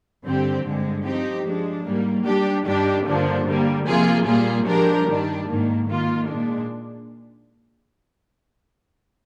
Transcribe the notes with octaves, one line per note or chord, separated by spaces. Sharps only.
G2 D3 G3 C4 G4
G2 D3 G#3
F3 C4 D#4 G4
F3 G#3 D4
G#2 G3 A#3
G3 D4 G4
G2 D#3 G3 D4 G4
G2 D3 F3 A#3 D4
D3 G3 A#3
C3 F3 A#3 F4 G#4
A#2 G3 A#3 F4 G#4
F3 G#3 D4 G4 A#4
G2 D#3 G3 D4
G#2 D#3 A#3
D#3 A#3 F4
A#2 G#3 D4